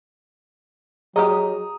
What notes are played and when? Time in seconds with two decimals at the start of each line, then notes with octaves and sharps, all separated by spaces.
1.16 F#3 G4 G#4 D#5 A#5 D#6